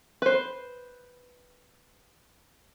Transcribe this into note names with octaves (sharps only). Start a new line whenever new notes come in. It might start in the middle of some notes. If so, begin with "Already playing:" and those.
B4 C5